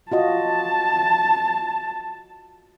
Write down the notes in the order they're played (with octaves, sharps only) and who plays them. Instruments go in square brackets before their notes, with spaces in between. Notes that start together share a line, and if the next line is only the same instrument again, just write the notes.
[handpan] F4 F#4 D#5 [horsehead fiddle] A5